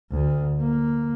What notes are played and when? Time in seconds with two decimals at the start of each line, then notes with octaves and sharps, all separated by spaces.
0.11 D2
0.60 A#3